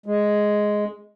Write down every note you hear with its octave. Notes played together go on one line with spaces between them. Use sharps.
G#3